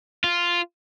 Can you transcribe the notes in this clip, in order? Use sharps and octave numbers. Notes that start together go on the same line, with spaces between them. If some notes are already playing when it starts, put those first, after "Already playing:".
F4